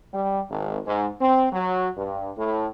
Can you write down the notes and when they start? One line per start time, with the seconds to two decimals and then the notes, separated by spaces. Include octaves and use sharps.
0.14 G3
0.50 G#1
0.87 G#2
1.21 C4
1.53 F#3
1.98 G2
2.38 A2